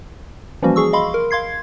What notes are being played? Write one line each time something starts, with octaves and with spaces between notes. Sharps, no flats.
E3 F3 G3 A#3 C#4 F#4
G#4 C#6 E6
D#5 F5 B5 C6
A#4
F5 C6 G#6 C7